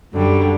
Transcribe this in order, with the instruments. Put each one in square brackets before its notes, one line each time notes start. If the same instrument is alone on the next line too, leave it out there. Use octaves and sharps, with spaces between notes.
[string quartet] F#2 D3 G3